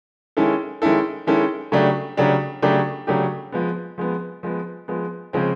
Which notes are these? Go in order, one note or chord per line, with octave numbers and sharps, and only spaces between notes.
D#3 G#3 C#4 E4 A4
D#3 G#3 C#4 E4 A4
D#3 G#3 C#4 E4 A4
C#3 F#3 A3 D4 G4
C#3 F#3 A3 D4 G4
C#3 F#3 A3 D4 G4
C#3 F#3 A3 D4 G4
F3 G#3 B3
F3 G#3 B3
F3 G#3 B3
F3 G#3 B3
C#3 F3 G#3 C4